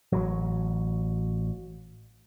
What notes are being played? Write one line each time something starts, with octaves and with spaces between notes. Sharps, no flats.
A1 F#3